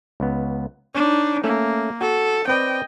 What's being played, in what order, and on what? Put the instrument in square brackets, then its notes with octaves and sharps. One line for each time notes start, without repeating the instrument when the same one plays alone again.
[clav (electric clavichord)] C#2 B3
[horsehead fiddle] D4 D#4 [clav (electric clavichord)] C#5
[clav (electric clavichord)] A3 C#4 E5 [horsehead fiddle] A#3
[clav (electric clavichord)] F#4 [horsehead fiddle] A4
[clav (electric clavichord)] C4 B4 D5 [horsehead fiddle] D#5 G5